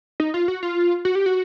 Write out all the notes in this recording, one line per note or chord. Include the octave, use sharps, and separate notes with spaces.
D#4
F4
F#4
F4
F#4
G4
F#4